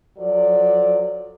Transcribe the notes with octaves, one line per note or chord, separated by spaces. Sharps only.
F3 F#3 A4 D5